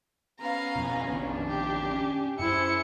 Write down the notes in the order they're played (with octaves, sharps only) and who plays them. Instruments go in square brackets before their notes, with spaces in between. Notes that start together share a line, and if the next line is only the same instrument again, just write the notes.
[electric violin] B3 C#4 [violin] F5 A#5
[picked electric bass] F2 B2
[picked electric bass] A#1 F2 D#3 [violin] D4
[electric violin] G4
[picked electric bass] C#4
[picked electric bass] F#2 [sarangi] E4 [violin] G#4 C5 [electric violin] C#7